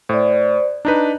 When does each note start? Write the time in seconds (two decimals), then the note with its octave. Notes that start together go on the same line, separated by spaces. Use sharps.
0.09 A2 C5 D5
0.85 D4 D#4 B4 A#5